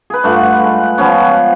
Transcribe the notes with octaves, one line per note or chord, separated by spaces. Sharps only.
G#4 B4
G2 A3 F4 F#5
G#3
F3 B3 C#4